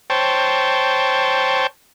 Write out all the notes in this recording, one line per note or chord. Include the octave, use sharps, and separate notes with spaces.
C5 C#5 G5 A5